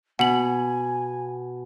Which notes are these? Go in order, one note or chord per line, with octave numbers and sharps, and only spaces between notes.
B2 F#5 G#5 F#7